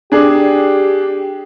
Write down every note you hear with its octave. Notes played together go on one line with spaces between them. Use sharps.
D4 G4 G#4